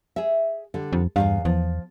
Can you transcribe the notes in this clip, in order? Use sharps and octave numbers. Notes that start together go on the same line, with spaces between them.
G#4 E5
D3 G3
F2
E2 G2 C3 F5
E2 F3